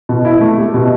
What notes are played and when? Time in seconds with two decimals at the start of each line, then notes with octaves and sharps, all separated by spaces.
0.09 B2
0.25 E4
0.41 A3
0.58 G4
0.74 B2